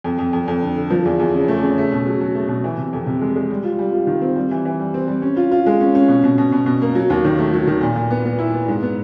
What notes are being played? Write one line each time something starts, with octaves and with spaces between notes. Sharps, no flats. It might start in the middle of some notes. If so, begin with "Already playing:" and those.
F2
F2
F2
F2
D3
D3
F3
E2
E2
C#3
A3
C#3
A3
B2
F#3
F#3
A3
B2
E3
C3
F2
C3
G#3
G#3
G3
F4
G3
F4
D#3
C4
G3
E3
E3
G3
C4
G3
C#4
F4
F4
G#3
C#4
C#4
B2
B2
B2
B2
B2
A#3
F#3
D#2
D#3
A3
F#3
D#3
A#2
A#2
B3
B3
E4
B3
G#2
B3